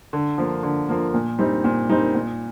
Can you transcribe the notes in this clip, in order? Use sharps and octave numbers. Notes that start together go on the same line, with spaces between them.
D3
F3 A#3
D3
F3 A#3
A#2
G3 C4 D#4
A#2
G3 C4 D#4
A#2